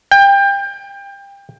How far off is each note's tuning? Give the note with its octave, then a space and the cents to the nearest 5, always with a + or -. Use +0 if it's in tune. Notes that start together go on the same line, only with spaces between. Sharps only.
G5 +25